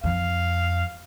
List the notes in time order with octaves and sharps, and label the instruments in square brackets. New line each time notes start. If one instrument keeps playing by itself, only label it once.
[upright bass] F2 [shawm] F5